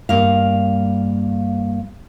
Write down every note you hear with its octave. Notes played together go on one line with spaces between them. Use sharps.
G2 A#3 F5